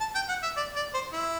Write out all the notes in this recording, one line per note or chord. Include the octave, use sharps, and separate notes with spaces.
A5
G5
F#5
E5
D5
D5
C5
E4